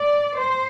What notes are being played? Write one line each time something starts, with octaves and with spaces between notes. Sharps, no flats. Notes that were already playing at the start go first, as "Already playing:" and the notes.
Already playing: D5
C5